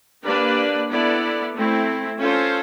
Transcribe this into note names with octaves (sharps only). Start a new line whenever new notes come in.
A#3 D4 G4 B4 D5
B3 E4 A4 D5
A3 C4 E4
C#4 F4 A4 C5